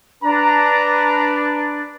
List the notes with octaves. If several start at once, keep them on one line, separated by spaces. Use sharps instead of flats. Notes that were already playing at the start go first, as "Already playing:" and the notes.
D4 B4 A#5